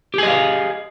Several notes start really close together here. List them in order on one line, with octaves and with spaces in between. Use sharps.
G4 G#4 D#5 F5